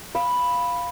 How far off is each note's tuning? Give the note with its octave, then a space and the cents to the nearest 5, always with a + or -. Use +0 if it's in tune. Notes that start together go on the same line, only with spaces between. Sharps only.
F5 +0 B5 +0